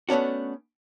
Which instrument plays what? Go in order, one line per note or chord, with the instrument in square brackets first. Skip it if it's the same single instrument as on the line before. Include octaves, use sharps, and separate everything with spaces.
[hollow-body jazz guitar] A3 B3 C#4 D4 F#4